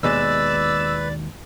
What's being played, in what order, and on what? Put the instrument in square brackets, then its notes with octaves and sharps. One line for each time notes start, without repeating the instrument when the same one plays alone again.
[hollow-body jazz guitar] D#2 B2 G#3 [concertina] B4 [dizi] D5 [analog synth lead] E6